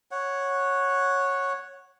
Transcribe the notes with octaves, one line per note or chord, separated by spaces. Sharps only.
C#5 F#5